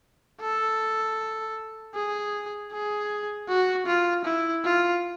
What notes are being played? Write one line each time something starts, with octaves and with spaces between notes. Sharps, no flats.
A4
G#4
G#4
F#4
F4
E4
F4